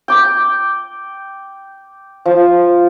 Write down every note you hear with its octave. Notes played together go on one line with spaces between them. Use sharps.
G5 D6
F3